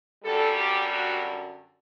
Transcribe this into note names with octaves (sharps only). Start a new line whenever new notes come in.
F#2 D3 G3 A4
G4
F#4